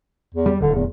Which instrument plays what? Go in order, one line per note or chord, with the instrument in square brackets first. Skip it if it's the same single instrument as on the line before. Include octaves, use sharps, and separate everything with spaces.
[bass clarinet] E2
[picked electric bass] G3
[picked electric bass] D1 [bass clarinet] D3
[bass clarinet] E2